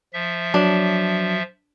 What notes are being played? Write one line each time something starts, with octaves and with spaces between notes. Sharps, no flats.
F3 E5
F#3 D4